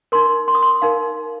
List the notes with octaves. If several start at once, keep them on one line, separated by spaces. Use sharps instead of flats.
D#4 A#4 C6
C6
D#6
C6
D#4 A#4 F5